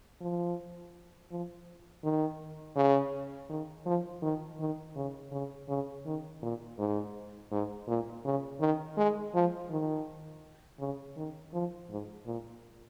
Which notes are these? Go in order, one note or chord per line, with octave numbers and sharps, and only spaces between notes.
F3
F3
D#3
C#3
D#3
F3
D#3
D#3
C#3
C#3
C#3
D#3
A#2
G#2
G#2
A#2
C#3
D#3
G#3
F3
D#3
C#3
D#3
F3
G#2
A#2